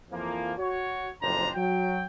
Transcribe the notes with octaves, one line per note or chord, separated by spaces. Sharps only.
F2 E3 F3 A#3
F#4 C#5
F#1 F2 A2 D4 C5 A#5
F#3 G5